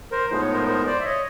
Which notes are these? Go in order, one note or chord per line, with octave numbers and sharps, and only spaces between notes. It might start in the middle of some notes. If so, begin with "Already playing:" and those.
A#4 C5
A2 F3 G#3 B3 D#4 C5
C#5
A#4 C5
A#4 C5
C5 D5
E5
C#5 D#5